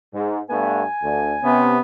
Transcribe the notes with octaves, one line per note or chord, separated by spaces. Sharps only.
G#2
G2 A3 B3 G#5
D2 D3
C3 B3 C#4